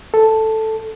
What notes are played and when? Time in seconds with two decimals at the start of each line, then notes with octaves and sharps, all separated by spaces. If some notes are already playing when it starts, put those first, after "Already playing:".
0.14 A4